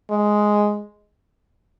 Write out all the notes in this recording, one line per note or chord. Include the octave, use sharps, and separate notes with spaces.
G#3